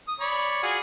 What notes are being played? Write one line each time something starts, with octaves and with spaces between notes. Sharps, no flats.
D#6
C#5 D5 B5
F4 F#4 G#4